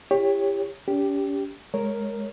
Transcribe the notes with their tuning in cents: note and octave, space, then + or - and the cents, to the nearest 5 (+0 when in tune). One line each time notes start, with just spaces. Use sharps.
E4 +30 G4 +25 C#5 +0
C#4 +45 G4 +0
G#3 +0 A#4 +0 C#5 +0